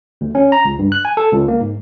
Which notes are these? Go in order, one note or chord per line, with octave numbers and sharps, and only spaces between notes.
D2
C#4
A#5
C#2
G2
F#6
G#5
A4
C#2
A#3
G#2